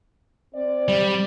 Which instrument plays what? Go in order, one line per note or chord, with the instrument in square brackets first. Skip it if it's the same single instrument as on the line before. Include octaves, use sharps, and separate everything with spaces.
[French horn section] C4 D5
[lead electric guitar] G3